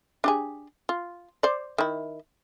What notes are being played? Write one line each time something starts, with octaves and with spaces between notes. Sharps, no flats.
D4 G4 G#4
F4
C5 D5
D#3 E4